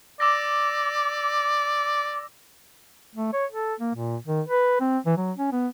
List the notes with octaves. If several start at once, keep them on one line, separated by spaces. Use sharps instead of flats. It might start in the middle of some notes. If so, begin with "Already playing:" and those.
D5 D6 E6 A#6
A3
C#5
A4
A#3
A#2
D#3
B4
C4
E3
F#3
C#4
B3